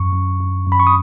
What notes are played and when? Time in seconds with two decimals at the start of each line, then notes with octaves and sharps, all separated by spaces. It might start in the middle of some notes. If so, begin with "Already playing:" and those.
Already playing: F#2 C#6
0.12 F#2
0.40 F#2
0.66 F#2
0.72 B5
0.80 C#6
0.87 D#6